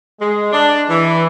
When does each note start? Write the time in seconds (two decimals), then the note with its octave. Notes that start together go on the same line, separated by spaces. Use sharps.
0.20 G#3
0.52 D4
0.89 E3